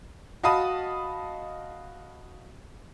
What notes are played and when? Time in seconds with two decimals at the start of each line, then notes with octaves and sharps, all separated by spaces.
0.43 F#4 D#5 F5 A5 B5 D#6